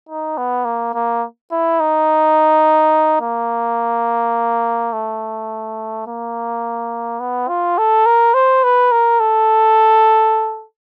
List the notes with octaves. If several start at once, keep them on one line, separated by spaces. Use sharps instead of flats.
D#4
B3
A#3
A#3
E4
D#4
A#3
A3
A#3
B3
F4
A4
A#4
C5
B4
A#4
A4